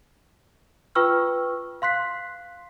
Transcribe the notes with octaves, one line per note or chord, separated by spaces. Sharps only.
F4 B4 G5 C#6 E6 F6
F5 C6 F#6 B6 C7